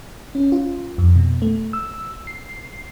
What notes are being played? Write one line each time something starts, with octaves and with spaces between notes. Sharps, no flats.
C#4
F4
F2
B2
A3
E6
C7